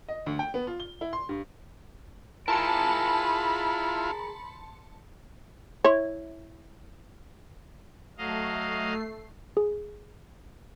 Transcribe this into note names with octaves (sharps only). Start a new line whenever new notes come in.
D#5
D2
G5
B3
F4
G7
E4
C6
G2
E4 F4 G#4 A#4 A5 B5 C6 C#7
E4 C#5
F#3 A3 D#5 F5 C7
G#4